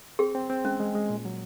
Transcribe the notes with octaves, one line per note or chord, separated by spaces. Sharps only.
C4 G#4
C4
C4
G#3 C#4
G#3
G#3
A#2
F#3